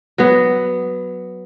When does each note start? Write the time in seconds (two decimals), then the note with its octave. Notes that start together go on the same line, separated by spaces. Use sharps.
0.18 F#3 B3